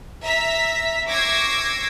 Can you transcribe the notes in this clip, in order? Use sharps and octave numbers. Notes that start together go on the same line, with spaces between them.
E5 A#5 B6
C#6 D6 E6 G#6 A#6 C7